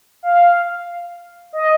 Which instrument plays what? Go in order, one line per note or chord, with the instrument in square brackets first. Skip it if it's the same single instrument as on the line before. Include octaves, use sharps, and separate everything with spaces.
[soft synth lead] F5
D#5